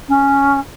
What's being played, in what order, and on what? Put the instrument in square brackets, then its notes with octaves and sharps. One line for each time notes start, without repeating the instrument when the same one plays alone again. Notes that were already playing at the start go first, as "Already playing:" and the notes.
[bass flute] C#4